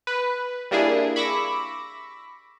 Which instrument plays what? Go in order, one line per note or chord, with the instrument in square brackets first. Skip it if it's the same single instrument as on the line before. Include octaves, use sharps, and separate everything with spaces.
[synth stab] B4
G3 A#3 D4 E4 G#4
B5 C#6 D6 E6 A#6